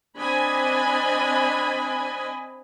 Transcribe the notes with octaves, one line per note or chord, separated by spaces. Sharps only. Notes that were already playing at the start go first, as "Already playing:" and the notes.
C4 D4 D#5 G#5 B5